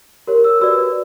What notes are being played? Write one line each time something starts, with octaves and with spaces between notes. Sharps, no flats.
G4 A#4 C#5
E6
F#4 B4 D5 E6